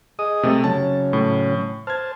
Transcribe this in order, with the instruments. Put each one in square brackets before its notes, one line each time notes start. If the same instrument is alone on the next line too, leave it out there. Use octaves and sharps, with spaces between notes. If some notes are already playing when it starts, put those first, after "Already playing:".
[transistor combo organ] G#4 D#5 D#6
[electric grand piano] C3 A3 A4
[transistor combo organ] C#3 F#3 C#4 [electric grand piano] A5
[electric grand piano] A2
[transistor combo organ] C5 A5 [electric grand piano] F6 G#6